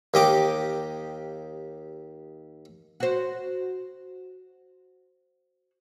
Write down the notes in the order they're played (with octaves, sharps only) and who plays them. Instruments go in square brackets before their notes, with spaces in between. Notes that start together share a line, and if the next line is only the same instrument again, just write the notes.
[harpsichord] D#2 G4 D#5 D6
[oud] F#4 C5